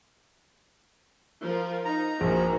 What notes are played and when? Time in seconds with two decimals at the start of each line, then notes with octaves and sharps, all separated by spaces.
1.41 F3 A#4
1.85 D#4 A#5
2.21 A#1 D#3 F#4 G#4 C5